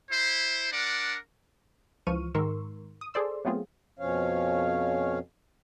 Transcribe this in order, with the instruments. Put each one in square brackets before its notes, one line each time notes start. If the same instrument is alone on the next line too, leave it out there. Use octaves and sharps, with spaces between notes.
[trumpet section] E4 C5
D4 A#4 D5 F#5
[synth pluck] C#2 E3 F3 C#6 F6 D#7
G#2 D#3 A#4 C6 C#6 E6
D#6
G#4 A4 C5 D5 C6 E6
F#3 A3 B3 C4 F4 G#4
[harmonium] F2 B2 F3 C#4 C#5 F5